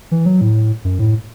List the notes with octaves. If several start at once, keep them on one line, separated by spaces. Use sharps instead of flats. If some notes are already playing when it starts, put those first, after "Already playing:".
E3
F#3
A2
F#2
A2